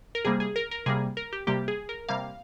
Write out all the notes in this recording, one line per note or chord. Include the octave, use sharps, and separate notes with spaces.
A#4
C3 G3 A#3 G#4
G#4
A#4
A#4
C3 G3 A#3 G#4
A#4
G4
C3 G3 A#3 G4
G#4
A#4
C3 G3 A#3 F5